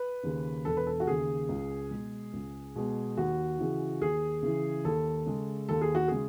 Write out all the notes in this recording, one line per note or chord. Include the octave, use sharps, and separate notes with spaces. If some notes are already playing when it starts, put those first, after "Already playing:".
Already playing: B4
D#2 C#3
E1 A4
B4
A4
F#4
D#2 C#3 G#4
C#2
B2 G#3
C#2
B2 G#3
D#2 F#4
C#3 E3
D#2 G#4
C#3 E3
D#2 A4
C#3 G#3
D#2 A4
G#4
F#4
C#3 G#3 G#4